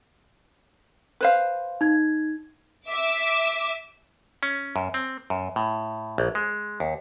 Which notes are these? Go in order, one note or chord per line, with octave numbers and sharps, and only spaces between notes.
B4 C5 F5
D#4 G#6
E5 D6
C#4
F#2
C4
F#2
A2
A#1
G#3
D#2